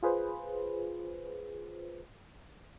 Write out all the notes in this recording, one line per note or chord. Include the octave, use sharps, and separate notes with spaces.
F4 G#4 B4 C5